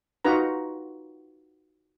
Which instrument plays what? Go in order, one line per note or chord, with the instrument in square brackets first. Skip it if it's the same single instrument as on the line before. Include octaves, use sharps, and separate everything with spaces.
[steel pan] D#4 F4 F#4 B4 A#5